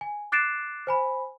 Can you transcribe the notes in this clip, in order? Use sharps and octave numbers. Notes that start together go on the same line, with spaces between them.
G#5
D6 F#6 A6 C7 D7 E7
C5 G#5 B5